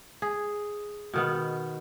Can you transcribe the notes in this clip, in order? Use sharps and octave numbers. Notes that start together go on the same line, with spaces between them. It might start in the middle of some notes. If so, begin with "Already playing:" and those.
G#4
B2 D#3 B3